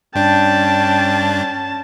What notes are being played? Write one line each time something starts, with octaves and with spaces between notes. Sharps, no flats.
G2 C#4 D4 G5 A5